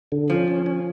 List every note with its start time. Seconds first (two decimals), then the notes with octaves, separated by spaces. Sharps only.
0.12 D3
0.30 F3 C#4
0.48 C#4
0.66 C#4